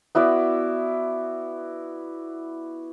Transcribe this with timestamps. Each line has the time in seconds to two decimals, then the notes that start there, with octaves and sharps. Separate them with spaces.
0.15 B3 E4 F#4 D5